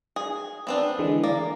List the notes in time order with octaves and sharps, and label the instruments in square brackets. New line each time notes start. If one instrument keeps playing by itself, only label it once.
[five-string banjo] G#4
B3 C4 D4
[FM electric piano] D3 E3 G#3
[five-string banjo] A#3 [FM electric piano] D5